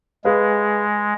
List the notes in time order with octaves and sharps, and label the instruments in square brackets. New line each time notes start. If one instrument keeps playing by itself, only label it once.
[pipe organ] G#3 [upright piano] G#4 B4 F5